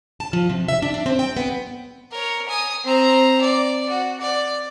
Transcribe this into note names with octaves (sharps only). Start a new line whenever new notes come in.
A5
F3
C3
E5
D4
D4
C4
G5
B3
A#4 C#5
G#5 D#6
C4 A#5
D5
F#4
D5